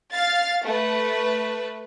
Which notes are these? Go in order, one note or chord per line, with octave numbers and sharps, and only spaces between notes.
F5 A6
A3 B4